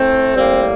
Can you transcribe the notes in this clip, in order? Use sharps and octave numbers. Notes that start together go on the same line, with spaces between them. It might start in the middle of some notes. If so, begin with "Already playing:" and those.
Already playing: A2 A3 C4
A2 G3 A#3 C4